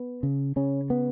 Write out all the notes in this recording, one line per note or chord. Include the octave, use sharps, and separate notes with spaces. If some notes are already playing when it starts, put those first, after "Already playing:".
Already playing: B3
C#3
C#3 C#4
B3